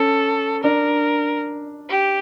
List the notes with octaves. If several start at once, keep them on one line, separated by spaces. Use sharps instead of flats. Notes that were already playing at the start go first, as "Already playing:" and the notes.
Already playing: C#4 A4
D4 A#4
G4